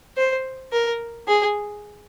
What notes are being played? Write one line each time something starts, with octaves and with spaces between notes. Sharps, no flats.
C5
A#4
G#4